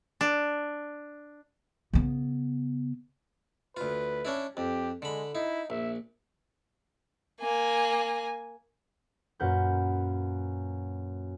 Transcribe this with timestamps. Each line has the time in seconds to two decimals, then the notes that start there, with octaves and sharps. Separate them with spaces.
0.21 D4
1.93 C#3 B3
3.77 D2 F4 B4
4.25 C#4 D4 E4
4.57 F2 G4
5.02 D3 G#3 B5
5.35 D#4 E4
5.70 A#1 E5
7.40 A#3 G#5
9.40 F#2 A#2 A#3 B4 F#5 G6